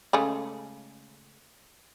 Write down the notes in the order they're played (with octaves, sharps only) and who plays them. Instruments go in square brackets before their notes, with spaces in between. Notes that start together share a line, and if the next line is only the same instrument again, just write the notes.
[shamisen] C#3 G#3 A3